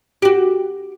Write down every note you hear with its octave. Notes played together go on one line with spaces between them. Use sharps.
F#4 G4